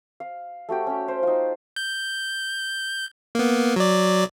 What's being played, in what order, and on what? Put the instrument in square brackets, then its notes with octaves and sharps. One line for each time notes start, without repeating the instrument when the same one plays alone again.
[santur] F5
A3 F#4 G4 G5
C#4 G4
C5
D#4 F4
[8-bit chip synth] G6
A#3 B3
F#3 D5